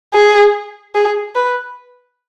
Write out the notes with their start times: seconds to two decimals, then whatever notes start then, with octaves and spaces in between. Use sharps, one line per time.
0.14 G#4
0.95 G#4
1.35 B4